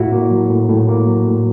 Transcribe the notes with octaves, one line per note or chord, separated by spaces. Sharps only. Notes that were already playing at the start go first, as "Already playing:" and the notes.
Already playing: A2 E4 F#4
A#3
F#3
A2
A2
A#3
F#3
A2